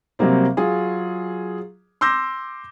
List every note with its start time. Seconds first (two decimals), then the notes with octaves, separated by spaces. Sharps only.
0.19 C3 F#3 G3 A#3 C4
0.57 F#3 F4 G#4
2.01 C6 D6 E6 G6 A#6